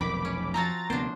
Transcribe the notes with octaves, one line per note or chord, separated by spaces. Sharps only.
F1 B1 F2 D#3 B5 D6
C#4
F3 C4 F#4 A#5 A6
D2 C3 A#3 B3 D4 C5